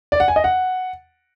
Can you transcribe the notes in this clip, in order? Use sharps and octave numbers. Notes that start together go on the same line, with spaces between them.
D5
F#5
G#5
D#5
F#5